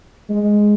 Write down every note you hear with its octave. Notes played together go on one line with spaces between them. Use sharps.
G#3